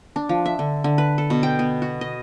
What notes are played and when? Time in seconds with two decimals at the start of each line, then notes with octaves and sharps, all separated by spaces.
0.16 D4
0.29 F3
0.46 E5
0.59 D3
0.84 D3
0.98 B4
1.18 A4
1.30 B2
1.43 G5
1.59 B3
1.82 F#4
2.01 D#5